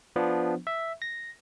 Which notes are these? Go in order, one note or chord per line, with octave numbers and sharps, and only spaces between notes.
F3 B3 D4
E5
A#6